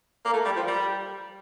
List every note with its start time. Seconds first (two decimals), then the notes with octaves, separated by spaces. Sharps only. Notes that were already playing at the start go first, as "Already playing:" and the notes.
0.25 A#3
0.33 A3
0.45 G3
0.56 F3
0.67 G3